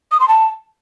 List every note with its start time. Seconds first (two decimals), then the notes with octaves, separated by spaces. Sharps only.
0.12 D#6
0.20 C6
0.28 A5